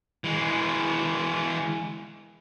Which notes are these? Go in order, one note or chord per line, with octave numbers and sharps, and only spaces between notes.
E3 G#3